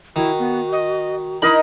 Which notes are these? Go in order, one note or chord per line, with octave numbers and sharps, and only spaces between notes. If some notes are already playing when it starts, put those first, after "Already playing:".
D#3 E4 F#4
B3
D#5
D#4 E4 A#4 D#5 B5